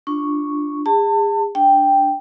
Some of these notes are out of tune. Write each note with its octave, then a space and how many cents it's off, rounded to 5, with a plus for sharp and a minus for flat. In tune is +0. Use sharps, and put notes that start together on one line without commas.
D4 +5 F4 -5 C#6 +0
G#4 -35 A5 +30
D4 +0 G5 +0